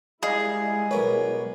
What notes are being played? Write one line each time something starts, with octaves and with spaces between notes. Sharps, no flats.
G3 G#3 E4 G#4 D5 D#5 F5
B1 A#4 B4 C#5